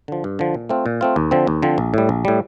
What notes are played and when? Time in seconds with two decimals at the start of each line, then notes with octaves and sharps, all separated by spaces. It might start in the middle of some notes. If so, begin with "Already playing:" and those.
0.08 D3 F3
0.24 G2
0.39 D3 F3
0.55 A#2
0.69 A3 C4 F4
0.86 A#2
1.01 A3 C4 F4
1.16 D#2
1.31 D3 F3 C4
1.47 D#2
1.62 D3 F3 C4
1.78 A#1
1.94 A2 G3
2.09 A#1
2.25 A2 G3